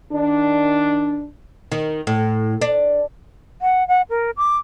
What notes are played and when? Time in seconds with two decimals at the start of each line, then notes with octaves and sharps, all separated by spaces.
0.12 D#3 D4
1.72 D#3
2.07 A2
2.61 D4
3.62 F#5
3.88 F#5
4.10 A#4
4.37 D6